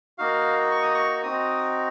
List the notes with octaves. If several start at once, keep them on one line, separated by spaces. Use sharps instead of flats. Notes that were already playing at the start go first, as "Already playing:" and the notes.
A#3 D#4 F#4 F5
C#6
D#6
C#6
C4 D#4 F#4 D#6